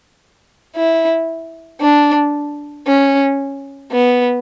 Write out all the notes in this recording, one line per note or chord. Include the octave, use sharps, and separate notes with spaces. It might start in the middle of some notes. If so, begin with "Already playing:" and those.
E4
D4
C#4
B3